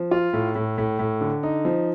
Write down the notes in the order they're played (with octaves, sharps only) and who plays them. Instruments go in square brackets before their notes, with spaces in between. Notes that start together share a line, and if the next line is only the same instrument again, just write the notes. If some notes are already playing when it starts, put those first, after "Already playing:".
Already playing: [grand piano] F3
F4
A2
A2
A2
A2
D3
D#4
F3